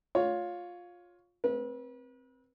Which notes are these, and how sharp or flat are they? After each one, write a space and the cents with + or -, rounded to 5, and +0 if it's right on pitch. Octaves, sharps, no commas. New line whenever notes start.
F4 +15 C#5 +10
C4 +5 B4 -35